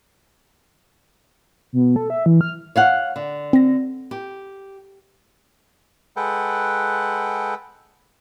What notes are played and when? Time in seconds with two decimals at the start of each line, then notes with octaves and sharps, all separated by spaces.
1.73 B2
1.96 A4
2.10 E5
2.26 E3
2.41 F6
2.76 C#5 F5 F#5
3.16 D3
3.53 C4 A#6
4.11 G4
6.17 G#3 A4 B4 F#5 G5